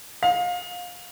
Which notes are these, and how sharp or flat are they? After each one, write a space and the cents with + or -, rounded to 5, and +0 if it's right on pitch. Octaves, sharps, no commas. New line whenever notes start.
F5 +30